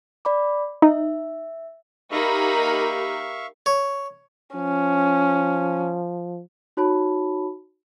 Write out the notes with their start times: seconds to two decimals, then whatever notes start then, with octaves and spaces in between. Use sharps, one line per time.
0.25 D5 B5 D6
0.82 D#4 E5
2.12 A#3 D#4 G4 A#4 E5 F5 B5 C#6
3.66 C#5
4.56 F3 C#4
6.77 D#4 F#4 C#5 A5 B5